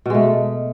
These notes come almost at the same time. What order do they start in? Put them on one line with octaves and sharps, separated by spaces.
B2 G#3 A3